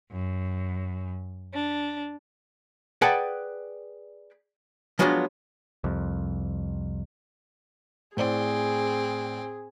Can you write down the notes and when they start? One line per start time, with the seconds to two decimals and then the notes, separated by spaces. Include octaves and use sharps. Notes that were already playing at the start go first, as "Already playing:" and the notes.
0.10 F#2
1.53 D4
3.02 G#4 B4 D5 F#5 G5 A5
4.99 F3 F#3 G#3 B3 D4 F4
5.84 C2 F2
8.17 A2 C4 G#4 C5 D5